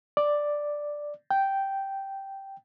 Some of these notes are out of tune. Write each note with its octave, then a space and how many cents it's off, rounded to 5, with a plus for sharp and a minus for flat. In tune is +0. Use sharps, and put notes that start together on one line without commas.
D5 +5
G5 -5